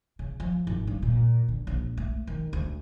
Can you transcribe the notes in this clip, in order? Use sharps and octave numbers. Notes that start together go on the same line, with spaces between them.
C#3
F3
G#1
G2
A#2
D3
A#1
A3
D#3
D2